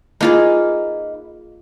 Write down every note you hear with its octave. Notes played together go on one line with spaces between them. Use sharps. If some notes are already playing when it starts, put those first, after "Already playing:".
A#3 D#4 F4 G#4 B4 D#5